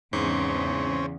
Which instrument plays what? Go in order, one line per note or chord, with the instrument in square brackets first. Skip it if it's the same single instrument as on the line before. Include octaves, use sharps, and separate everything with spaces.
[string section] E2 C#3 [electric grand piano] G#2 [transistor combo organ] C4 C#4